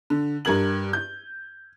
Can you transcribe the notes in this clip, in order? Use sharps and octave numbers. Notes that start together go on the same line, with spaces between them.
D3
G2 A#4 G#6 F#7
G6